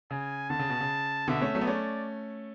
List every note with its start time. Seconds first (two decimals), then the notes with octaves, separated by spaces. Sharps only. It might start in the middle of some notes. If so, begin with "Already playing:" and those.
0.11 C#3 G#5
0.50 D3 A5
0.59 C#3
0.69 B2
0.80 C#3
1.28 B2 D3 E5
1.41 A3 C#4
1.55 F#3 A3
1.61 B3
1.67 A3 C#4 D5